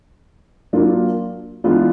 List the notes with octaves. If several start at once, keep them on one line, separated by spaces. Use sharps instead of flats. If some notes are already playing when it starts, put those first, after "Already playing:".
F#3 A#3 D4 F4
E3 G#3 B3 D4 F4